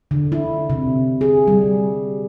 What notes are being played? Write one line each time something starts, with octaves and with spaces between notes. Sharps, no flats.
D3
E4
C3
G#4
G3